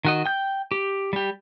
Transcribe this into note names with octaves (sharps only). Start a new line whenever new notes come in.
D#3 F#4 D#5
G5 G6
G4
G3 G4